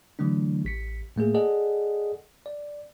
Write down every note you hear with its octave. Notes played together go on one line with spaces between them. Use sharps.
D3 E3 F#3 A3 D4
A1 B6 C#7
A2 A3 A#3 G#4
G#4 A4 D5 D#5 F#5
D5